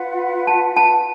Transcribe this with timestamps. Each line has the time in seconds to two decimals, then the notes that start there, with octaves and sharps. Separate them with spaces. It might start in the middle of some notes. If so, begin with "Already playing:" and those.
Already playing: F4 B4 F#5
0.47 A5
0.76 A5